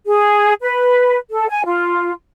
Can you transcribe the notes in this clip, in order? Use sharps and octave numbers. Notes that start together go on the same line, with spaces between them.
G#4
B4
A4
G#5
F4